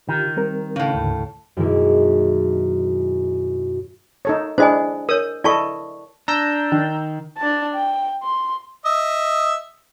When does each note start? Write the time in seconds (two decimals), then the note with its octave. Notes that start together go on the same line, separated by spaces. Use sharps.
0.09 D3 D#3 F4 G4
0.36 G3 C4 A#4
0.76 A2 C#3 C#4
0.95 D2 G#2 D3
1.57 F#2 B2 D#3 G#3 A#3 E4
4.25 D#4 A4 C#5
4.58 D4 E4 G#4 C5 D#5 G#5
5.09 A#4 C#5 D#6
5.44 E4 A4 D5 D#5 A5 C#6
6.28 D4 A#5 E6 G6
6.72 D#3
7.38 D4 A5
7.75 G5
8.23 C6
8.85 D#5 E5